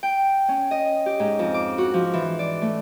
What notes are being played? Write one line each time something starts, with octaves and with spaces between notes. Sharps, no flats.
G5
C#4
D#5
G4
G#2
F2
D6
F#4
F3
E3
D5
A3